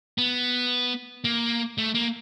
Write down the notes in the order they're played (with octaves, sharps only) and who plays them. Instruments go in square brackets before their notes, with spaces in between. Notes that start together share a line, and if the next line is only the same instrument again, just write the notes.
[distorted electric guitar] B3
A#3
A3
A#3